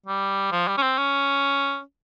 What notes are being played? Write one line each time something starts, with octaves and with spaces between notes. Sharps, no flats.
G3
F3
G3
C#4
C4
C#4